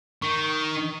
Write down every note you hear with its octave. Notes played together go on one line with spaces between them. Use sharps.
D#3 C#6